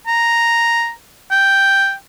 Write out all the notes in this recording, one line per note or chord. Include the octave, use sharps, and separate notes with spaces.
A#5
G5